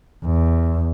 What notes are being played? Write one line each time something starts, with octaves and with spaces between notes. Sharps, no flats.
E2